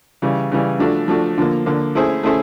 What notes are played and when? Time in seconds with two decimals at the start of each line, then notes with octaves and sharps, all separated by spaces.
0.22 C#3 E3 G3
0.51 C#3 E3 G3
0.79 F3 A3 D4 F#4
1.08 F3 A3 D4 F#4
1.38 D3 F3 A#3
1.66 D3 F3 A#3
1.95 A3 C#4 E4 G#4 C5
2.23 A3 C#4 E4 G#4 C5